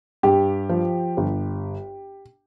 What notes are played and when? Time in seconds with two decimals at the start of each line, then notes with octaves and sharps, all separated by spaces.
0.23 G2 G4
0.69 F3
1.17 G1